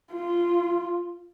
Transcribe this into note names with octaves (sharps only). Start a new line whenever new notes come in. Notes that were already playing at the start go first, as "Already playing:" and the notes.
F4